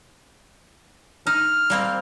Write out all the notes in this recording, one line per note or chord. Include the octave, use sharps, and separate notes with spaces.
D#4 F6
G3 A#3 C4